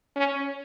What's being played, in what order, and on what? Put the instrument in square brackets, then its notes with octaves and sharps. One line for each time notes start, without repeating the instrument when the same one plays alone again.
[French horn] C#4